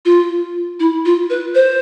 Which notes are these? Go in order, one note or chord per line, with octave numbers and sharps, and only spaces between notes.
F4
E4
F4
B4
C5